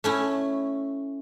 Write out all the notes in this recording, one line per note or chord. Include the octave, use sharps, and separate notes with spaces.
A3 C#4 E4